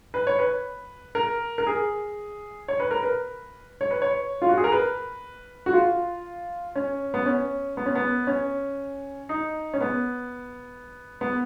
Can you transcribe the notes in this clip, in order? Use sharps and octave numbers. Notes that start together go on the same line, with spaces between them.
B4
C#5
B4
A#4
A#4
G#4
C#5
B4
A#4
B4
C#5
B4
C#5
F4
F#4
G#4
A#4
B4
F#4
F4
C#4
B3
C#4
B3
C#4
B3
C#4
D#4
C#4
B3
B3